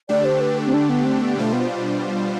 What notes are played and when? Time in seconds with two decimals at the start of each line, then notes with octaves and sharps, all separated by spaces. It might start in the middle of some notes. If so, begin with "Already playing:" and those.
0.09 D3 A3 D4 G4 D5
0.25 C5
0.41 B4
0.66 C4
0.74 D4
0.89 B3
1.05 C4
1.21 B3
1.37 B2 G3 A3 D4 F4 C5
1.53 B3